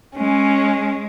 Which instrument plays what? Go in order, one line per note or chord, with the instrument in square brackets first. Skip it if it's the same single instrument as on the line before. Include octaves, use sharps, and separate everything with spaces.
[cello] G#3 [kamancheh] C#4